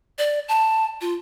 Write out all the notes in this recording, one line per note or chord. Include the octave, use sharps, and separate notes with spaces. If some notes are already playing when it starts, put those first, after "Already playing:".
D5
A5
F4